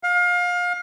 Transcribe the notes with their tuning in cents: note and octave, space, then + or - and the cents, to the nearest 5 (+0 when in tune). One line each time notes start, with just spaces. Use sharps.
F5 +30